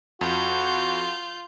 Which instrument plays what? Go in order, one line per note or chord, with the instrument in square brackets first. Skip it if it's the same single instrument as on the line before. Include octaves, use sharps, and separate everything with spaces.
[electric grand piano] F2 [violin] F4 G6 [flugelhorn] F#4